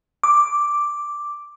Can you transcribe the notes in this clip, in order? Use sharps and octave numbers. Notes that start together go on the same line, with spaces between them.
D6